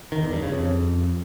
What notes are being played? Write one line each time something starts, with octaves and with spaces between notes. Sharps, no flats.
D#3
E2
G2
C#3
F2